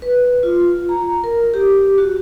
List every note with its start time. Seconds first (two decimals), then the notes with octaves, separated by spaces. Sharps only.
0.02 B4
0.43 F4
0.89 A#5
1.24 A#4
1.54 G4
1.98 F#4